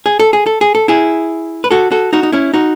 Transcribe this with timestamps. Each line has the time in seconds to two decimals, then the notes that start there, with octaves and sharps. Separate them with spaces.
0.06 G#4
0.20 A4
0.33 G#4
0.46 A4
0.61 G#4
0.75 A4
0.88 E4 G#4
1.64 B4
1.71 F#4 A4
1.91 F#4 A4
2.13 D#4 F#4
2.23 D#4
2.32 C#4 E4
2.54 D#4 F#4